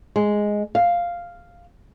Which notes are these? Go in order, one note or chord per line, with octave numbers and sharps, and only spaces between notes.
G#3
F5